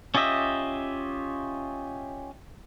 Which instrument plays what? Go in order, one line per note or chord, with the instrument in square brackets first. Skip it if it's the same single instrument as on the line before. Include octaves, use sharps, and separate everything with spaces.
[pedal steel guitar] C#4 F4 G4 D#5 E5